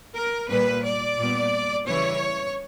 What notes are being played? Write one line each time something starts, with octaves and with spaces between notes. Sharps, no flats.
A#4
A#2 G3 A#3 B4
D5
A#2 G3 B3
C#3 E3 G3 C#5